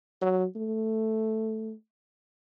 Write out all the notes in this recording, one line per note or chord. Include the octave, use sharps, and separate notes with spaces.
F#3
A3